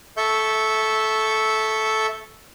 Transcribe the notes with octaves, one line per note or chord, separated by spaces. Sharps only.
A4 E5 C#6 G6